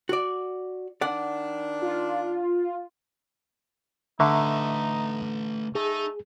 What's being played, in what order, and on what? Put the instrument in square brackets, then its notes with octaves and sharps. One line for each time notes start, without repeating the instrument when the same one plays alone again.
[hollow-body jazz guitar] F#4 D5
[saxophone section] D#3 D4 [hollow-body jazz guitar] D5 F#5
[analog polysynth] F4
[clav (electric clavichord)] D3 [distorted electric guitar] A3 B4 [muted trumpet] D#4 [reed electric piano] E5 A#5 C#6
[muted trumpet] A3 [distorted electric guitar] D#4 [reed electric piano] G#4